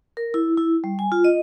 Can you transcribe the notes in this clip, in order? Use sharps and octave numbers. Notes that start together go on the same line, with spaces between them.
A#4
E4
E4
G3
G#5
F4
D#5